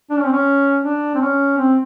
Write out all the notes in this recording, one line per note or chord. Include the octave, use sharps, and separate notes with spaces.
D4
C#4
C4
C#4
D4
C4
C#4
C4